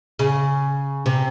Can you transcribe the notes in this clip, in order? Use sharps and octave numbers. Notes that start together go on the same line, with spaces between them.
C#3
C3